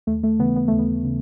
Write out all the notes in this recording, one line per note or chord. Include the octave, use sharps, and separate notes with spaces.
D#2 A3
A3
C#3 E3 B3
B3
D#2 A3
B3
C#3